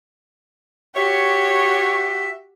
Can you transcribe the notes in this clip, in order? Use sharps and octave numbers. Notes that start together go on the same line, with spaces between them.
F#4 G4 C#5 E5